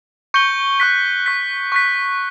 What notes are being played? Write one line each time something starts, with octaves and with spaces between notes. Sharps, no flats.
C#6 G6 C#7 G7
C#6 F#6 B6
C#6 F#6 B6
C#6 F#6 B6